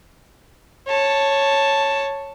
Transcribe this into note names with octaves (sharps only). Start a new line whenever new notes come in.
C#5 A5